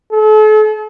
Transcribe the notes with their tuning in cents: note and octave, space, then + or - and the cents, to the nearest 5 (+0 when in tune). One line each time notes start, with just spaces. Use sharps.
A4 -40